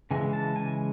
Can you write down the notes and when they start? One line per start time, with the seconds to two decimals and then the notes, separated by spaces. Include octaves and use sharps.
0.11 C#3 E3 G#3 G#5
0.33 A5
0.56 G#5